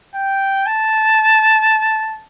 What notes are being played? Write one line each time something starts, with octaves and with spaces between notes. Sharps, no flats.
G5
A5